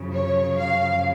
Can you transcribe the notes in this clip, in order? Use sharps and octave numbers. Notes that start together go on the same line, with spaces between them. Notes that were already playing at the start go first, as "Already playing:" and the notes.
Already playing: F#2 C#3 F3
C#5
F5